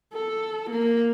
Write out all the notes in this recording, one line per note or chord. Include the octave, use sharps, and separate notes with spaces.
A4
A#3